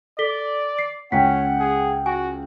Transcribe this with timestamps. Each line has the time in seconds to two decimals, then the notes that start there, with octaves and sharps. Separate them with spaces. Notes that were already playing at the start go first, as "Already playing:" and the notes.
0.19 A4 D5 B6 G7
0.79 C7
1.12 C#2 C#4 F#5 G5 B6
1.60 G#4
2.06 F#4 G#5